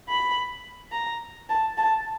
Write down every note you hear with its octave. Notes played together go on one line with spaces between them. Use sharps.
B5
A#5
A5
A5